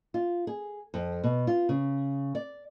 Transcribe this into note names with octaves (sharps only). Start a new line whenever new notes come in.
F4
G#4
F2
B2
F4
C#3
D5